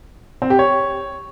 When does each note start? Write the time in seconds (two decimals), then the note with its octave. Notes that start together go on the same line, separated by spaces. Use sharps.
0.42 C4
0.50 G4
0.59 C#5